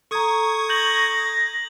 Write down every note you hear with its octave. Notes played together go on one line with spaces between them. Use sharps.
A4 A#5 C#6 D#6 G#6
G6 A#6 F#7